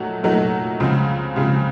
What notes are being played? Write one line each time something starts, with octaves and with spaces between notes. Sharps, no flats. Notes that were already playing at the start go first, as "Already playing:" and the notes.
Already playing: A#2 F#3 A3 D#4 F#4
A#2 F#3 A3 D#4 F#4
C#2 C#3 F3 C4
C#2 C#3 F3 C4